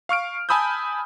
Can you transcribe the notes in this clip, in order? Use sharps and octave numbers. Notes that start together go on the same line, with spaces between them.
F5 C#6 F6 D7
G#5 A5 B5 D#6 E6 G6